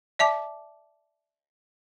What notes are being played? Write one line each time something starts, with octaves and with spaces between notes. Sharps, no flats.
D5 E5 A5 D6